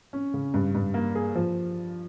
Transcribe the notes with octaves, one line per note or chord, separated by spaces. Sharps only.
C#4
C#3
G2
G2
A#3
G#4
F3